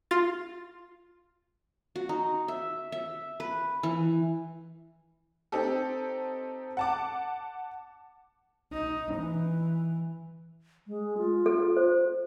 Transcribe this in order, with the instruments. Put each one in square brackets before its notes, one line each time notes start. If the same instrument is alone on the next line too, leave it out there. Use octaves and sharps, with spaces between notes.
[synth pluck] F4 A6
[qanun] F#4
D#4
E5
E5
B4
E3
[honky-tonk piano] C4 D#4 G4 A4
F#5 A5 D6
[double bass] D#4
E3
[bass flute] G#3
F4
[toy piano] A4
C5